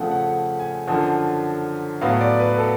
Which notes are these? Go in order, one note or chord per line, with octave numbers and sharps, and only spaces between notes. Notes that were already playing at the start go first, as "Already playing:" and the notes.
Already playing: F2 C#3 F3 A3 F5 F#5
F#5
G#5
F#2 D3 F3 F#5
A2 F#3 B3 F5
D5
B4
A4